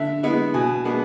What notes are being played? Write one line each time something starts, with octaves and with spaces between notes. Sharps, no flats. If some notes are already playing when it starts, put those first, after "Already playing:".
Already playing: D3 E5
G#3 B3 E4
B2 G#5
G#3 B3 D4